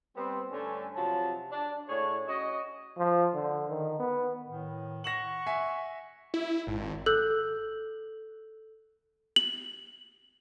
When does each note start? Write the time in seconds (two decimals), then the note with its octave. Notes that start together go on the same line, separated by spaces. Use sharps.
0.16 G3 B3 C4
0.51 G2 D3 A3 C#4
0.96 C3 F3 F#3 A5
1.51 D4
1.89 A2 D4 G#4 C#5
2.28 C#4 F#4 D#5
2.98 F3
3.34 D3
3.70 D#3
3.99 B3
4.47 A2 D#3
5.04 F#5 C#6 A#6 E7 F#7
5.47 E5 G#5 B6
6.34 E4
6.67 G#1
7.06 A4 E6 F#6 G6 F#7
9.36 F#7